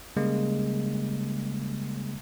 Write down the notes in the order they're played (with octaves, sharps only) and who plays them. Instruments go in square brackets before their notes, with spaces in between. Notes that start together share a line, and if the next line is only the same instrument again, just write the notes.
[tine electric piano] C#3 G3 G#3 A#3